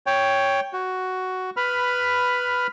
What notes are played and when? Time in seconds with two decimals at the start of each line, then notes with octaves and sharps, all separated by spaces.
0.06 C#5 G5
0.73 F#4
1.57 B4 B5 F6